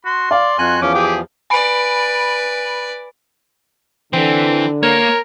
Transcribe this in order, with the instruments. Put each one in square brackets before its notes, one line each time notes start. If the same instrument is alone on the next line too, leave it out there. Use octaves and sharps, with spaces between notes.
[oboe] F#4 [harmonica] C6
[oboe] D5 [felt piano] F5
[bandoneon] F2 G#5 F#6 [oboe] F#4
[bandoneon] E2 F3 [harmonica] C#4 [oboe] D6
[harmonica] G4 G#4
[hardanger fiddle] B4 D5 [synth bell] G#5 B5 D7
[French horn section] D3 [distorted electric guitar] E3 [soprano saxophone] C4
[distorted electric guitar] A#3 [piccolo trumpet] A#4 [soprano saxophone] C#5